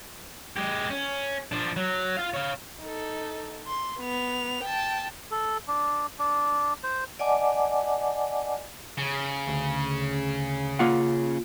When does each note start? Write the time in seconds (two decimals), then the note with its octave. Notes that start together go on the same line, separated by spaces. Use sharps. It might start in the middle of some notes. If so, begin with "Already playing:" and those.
0.57 G#3 G4
0.90 C#4
1.52 F3 D4
1.76 F#3
2.17 F4 F5
2.34 C#5 F5
2.81 D#4 A4
3.66 C6
4.00 B3 F7
4.64 G5 A5
5.31 A4
5.68 D4
6.19 D4
6.84 C5
7.19 D5 D#5 F#5 G#5 A5 D6
8.98 C#3
9.48 D2
10.79 A#3 F4 F#5